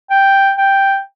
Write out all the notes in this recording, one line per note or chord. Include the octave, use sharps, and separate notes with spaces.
G5
G5